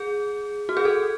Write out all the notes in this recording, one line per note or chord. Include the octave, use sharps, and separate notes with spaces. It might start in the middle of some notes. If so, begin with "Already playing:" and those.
Already playing: G#4
F#4
G#4
A4